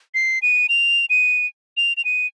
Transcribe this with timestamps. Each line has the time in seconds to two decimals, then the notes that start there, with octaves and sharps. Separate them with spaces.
0.14 C7
0.42 D#7
0.69 F7
1.10 D#7
1.77 F7
1.97 F7
2.05 D#7